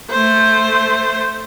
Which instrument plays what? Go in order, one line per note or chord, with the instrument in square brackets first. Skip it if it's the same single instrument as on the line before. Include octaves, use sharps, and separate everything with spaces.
[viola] A3 C5